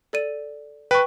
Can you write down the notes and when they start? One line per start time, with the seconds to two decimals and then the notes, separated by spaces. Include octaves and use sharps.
0.13 A4 D5 D#7
0.91 B4 G5 C#6